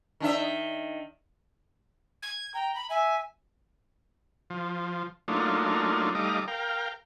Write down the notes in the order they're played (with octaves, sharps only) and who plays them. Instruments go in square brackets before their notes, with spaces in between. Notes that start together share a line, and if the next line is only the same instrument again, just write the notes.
[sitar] D#3 D4 E5
[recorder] G#6
[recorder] G5 [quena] A#5
[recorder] B5
[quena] E5 [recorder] G#5
[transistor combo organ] F3
F#3 A3 A#3 D4 D#4 F4
G3 A3 D#4 D#5 F5 D6
A#4 F5 G5